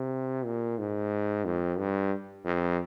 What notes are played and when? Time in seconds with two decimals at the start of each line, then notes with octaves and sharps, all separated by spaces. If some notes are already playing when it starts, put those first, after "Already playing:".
Already playing: C3
0.45 A#2
0.78 G#2
1.45 F2
1.78 G2
2.44 F2